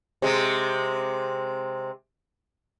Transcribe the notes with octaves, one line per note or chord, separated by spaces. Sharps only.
C3 G#3